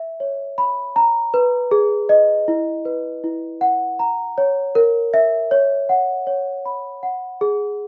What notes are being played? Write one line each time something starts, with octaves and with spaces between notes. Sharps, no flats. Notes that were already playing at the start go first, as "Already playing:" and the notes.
Already playing: E5
C#5
B5
A#5
B4
G#4
D#5
E4
B4
E4
F#5
A#5
C#5
A#4
E5
C#5
F#5
C#5
B5
F#5
G#4